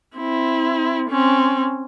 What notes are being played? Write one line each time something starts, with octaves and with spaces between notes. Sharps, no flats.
C4 E4
C4 C#4